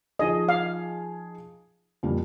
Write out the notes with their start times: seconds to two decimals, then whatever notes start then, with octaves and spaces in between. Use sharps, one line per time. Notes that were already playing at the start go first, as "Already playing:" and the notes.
0.19 F3 D#4 G#4 D#5
0.49 F5
2.03 F2 A#2 G3